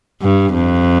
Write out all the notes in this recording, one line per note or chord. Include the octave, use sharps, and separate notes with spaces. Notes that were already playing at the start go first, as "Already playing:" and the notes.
G2
F2